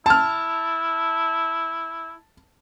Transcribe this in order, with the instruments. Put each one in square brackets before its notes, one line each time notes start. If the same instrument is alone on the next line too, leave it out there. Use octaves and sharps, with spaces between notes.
[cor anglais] E4 [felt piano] A5 F6